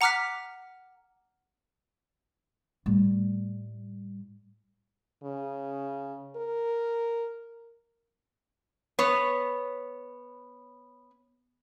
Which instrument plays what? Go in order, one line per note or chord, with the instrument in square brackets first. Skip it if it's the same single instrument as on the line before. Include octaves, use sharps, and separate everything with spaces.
[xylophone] F#5 A#5 D6 F6 F#6 B6
[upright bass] A2 G3
[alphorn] C#3
A#4
[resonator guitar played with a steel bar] B3 C#5